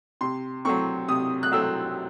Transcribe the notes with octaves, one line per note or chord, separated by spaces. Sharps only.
C3 C6
F#3 A3 C4 C#6
C3 D#6
F#6
F#3 A3 C4 E6